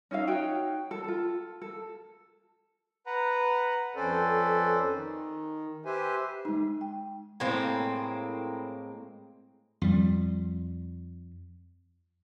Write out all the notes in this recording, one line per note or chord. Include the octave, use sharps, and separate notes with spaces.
C#4 D#4 E5 F5
D#4 F#4 C#5 G5
A4
F4 A4
A4
B4 F#5 A#5
F2 C#4 A4 B4 C5 D5
D#3
G4 B4 C5 E5 G#5
G#3 D#4
G5
A2 G#3 A#3 C4
F2 G3